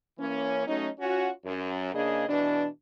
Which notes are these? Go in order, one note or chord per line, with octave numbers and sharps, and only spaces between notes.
E3 A#3 C#4
F#3 A3 C#4 D#4
C#4 F4 F#4
F#2
C#3 A#3 D4 G#4 D#5
B2 E3 D4